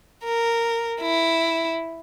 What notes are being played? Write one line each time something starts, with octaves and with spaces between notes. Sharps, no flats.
A#4
E4